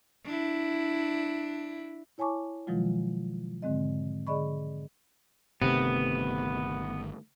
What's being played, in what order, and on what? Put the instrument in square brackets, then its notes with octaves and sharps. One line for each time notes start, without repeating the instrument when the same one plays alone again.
[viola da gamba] D4 E4
[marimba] E4 C#5 G#5 A5 C#6 D6
B2 D#3 F3 F#3 G#3 F4
G#2 D3 G#3 C4 D#5
D3 G#4 D5 D#5 B5 C#6
[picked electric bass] G1 D#3 A3 [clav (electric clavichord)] C3 [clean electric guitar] B3